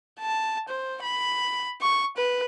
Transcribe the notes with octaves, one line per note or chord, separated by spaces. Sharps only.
A5
C5
B5
C#6
B4